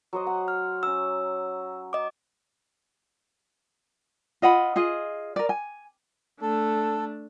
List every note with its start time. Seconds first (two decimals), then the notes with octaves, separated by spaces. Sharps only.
0.13 F#3 C5 D#5
0.27 F#5 E6
0.48 F6
0.83 C#4 A#5 E6
1.93 D#5 D6
4.42 F4 D#5 F#5 B5
4.76 F4 G#4 D#5
5.36 A#4 D5
5.49 G#5
6.42 A3 D4 A4